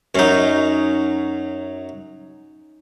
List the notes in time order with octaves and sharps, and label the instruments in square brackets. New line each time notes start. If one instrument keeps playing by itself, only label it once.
[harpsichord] F#2 F#3 [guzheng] C#4 D#4